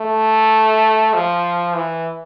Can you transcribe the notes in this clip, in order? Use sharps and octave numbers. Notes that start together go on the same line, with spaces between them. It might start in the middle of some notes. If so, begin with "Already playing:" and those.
Already playing: A3
F3
E3